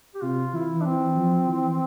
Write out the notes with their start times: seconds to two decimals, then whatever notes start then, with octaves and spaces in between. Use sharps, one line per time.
0.15 G4
0.23 C3 F4
0.54 E3 E4
0.81 D4
0.85 E3 C4
1.16 F3
1.48 E3